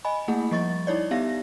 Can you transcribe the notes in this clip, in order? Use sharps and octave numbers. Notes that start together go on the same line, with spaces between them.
D#5 G#5 B5
A3 A#3 E4 G#4 F#5
F3 G3 D#5 C#6 A6
D#4 E4 C#5 D5
B3 D#4 G4 E5 F5 A#6